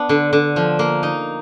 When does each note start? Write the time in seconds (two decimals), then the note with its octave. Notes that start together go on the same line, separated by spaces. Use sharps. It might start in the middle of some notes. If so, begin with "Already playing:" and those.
Already playing: B3 D4
0.09 D3
0.33 D3
0.56 F3
0.79 A#3
1.03 D#4